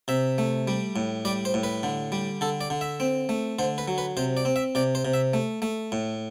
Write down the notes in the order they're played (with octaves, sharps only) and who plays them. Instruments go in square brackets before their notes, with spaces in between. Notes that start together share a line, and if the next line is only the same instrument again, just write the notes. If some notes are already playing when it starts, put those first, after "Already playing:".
[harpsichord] C3 E5
A3
G3
A2
G3 D5
C5
A2
B4
D3
G3
D3 A4
D5
D3
E5
C4
A3
D3 C5
B4
F#3
B4
C3 C5
D5
C4
E5
C3 D5
C5
C3
E5
A3
A3
A2